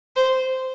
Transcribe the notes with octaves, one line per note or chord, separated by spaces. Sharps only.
C5